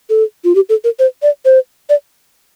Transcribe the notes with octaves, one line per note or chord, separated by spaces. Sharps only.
A4
F4
G4
A4
A#4
C5
D5
C5
D5